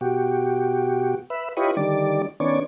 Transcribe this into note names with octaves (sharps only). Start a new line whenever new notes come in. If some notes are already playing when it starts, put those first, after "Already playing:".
B2 F#4 G4
B4 E5
E4 F4 G4 B4 C#5 D#5
D3 D#3 G3 D5
D#3 B3 C#4 D4 C#5 D5